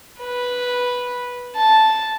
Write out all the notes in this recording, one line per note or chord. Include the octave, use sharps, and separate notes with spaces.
B4
A5